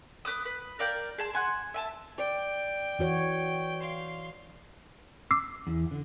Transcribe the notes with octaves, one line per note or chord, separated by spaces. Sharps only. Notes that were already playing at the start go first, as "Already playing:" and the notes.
B3 B4 D6 D#6
B4
A#4 D5 F5 G5
G#4 A5 C6
F#5 G#5 C6
E5 G#5 A5
D5 G5
E3 F#4 C#5
F5 C6
D6 E6 C7
E2
D3